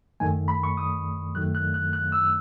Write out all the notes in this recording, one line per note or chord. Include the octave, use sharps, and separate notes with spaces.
F#2 D#3 A3 G#5
B5
C#6
D#6
F#2 D#3 F#3 A3 F#6
F#6
F#6
F#6
E6